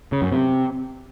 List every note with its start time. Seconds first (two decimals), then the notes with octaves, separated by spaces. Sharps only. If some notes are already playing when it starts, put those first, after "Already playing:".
0.12 C#3
0.22 F#2
0.32 C3